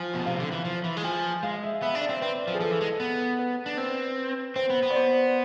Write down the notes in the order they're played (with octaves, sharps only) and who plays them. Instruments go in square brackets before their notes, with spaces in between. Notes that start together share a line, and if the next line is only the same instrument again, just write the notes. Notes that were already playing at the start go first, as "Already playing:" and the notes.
Already playing: [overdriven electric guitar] F3 [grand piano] G#5
[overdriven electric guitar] B2
[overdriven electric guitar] C3 [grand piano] F5
[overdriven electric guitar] D3
E3
F3
E3
G#3
[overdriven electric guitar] F3 [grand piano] G#5
[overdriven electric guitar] G#3 [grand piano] F5
[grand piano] E5
[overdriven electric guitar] B3 [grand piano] E5
[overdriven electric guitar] D4
[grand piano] D5
[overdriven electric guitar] C4
[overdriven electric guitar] C4 [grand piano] B4
[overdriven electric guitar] F3
[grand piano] G#4
[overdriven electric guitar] F3 [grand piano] A4
[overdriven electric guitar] E3
G#3
B3
[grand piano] B4
[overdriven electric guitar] D4
[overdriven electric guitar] C4 [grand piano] B4
[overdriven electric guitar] C4 [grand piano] C5
[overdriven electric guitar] B3
B3
[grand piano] D5
C5